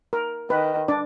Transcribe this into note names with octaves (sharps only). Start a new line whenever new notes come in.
A#4
D#3 B4
D4 D5